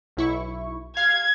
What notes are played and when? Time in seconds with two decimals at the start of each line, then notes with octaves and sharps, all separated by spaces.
0.17 B1 E4 C#6
0.97 F5 G#6